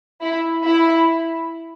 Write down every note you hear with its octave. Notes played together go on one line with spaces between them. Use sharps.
E4
E4